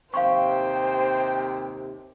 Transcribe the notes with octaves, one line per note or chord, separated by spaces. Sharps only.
D#2 C3 C5 F5 G5 C6 C#6